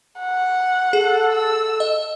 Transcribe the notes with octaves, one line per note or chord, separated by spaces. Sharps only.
F#5
G#4 A4
E6
D#5